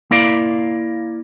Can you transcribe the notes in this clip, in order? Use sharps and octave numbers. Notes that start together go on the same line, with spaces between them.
A#3 E4 A#4 D5 F5